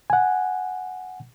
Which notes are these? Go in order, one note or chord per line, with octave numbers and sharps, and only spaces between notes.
F#5 G#5